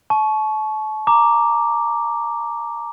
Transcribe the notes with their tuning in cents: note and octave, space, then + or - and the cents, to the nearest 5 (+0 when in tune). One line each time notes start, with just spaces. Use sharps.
A5 -35 C#6 +0
A#5 +0 D6 +0